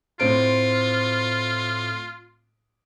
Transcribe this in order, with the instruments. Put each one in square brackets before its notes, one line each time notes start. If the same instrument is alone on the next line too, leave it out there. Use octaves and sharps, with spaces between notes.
[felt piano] A2 C4 D7 [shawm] F4